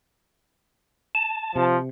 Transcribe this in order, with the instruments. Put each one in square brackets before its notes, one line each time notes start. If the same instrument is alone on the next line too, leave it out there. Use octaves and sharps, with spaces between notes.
[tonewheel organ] A5
[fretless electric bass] C3 [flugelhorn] F3